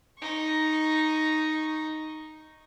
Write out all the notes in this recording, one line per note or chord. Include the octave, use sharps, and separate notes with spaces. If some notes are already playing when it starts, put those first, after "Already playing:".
D#4 C#6